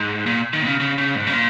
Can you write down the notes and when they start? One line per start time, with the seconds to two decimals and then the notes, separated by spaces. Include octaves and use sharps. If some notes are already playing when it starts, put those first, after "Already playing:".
Already playing: G#2
0.26 A#2
0.53 D#3
0.62 A#2
0.67 C#3
0.80 C#3
0.98 C#3
1.15 G#2
1.27 C#3
1.33 A#2